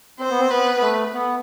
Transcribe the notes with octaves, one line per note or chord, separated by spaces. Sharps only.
C4 C5
B3
C4
B3 B4
B3
A3
B3